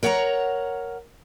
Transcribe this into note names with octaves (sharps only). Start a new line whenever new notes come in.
A#4 C#5 F#5 A5 A#5